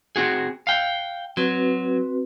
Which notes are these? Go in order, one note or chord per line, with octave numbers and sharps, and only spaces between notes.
C4 F#4 G#4
F5 G5
F#3 C4 F#4 B4